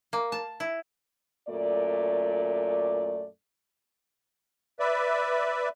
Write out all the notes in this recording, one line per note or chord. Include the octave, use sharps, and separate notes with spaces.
A#3
A5
E4
F#2 A#2 A3 D5
B4 D5 E5